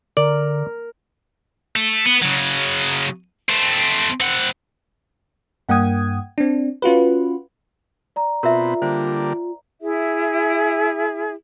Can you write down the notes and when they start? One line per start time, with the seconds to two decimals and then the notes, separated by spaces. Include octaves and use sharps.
0.17 D3 A#4 D5
1.76 A3
2.06 B3
2.23 C#3 F#3
3.49 A3 C4
4.20 C4 F#5
5.69 G2 A#3 F#5 G5 D#6 G#6
6.38 C4 D4
6.82 C#4 F4 F#4 B4
8.16 D5 A#5
8.43 B2 C4 F4 A#4 E5 B5
8.82 D3 G3 A#3 C5
9.81 E4 G#4 E5